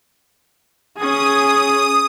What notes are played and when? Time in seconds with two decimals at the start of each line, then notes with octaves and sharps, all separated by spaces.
0.97 C#4 G#4 D#6